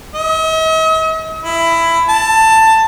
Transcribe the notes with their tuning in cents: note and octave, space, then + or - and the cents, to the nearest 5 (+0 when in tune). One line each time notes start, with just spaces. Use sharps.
D#5 +45
E4 +15
A5 +15